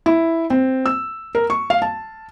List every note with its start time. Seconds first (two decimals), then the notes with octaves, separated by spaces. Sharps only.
0.06 E4
0.50 C4
0.86 E6
1.35 A#4
1.50 C#6
1.70 F5
1.82 A5